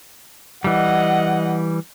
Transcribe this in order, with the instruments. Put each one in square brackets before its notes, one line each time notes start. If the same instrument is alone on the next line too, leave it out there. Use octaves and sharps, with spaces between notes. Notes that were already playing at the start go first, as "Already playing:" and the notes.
[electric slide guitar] E3 G3 [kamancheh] D#5 F#5